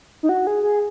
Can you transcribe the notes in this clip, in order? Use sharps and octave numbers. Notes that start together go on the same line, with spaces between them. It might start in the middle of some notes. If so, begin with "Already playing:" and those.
D#4
F#4
G#4
G#4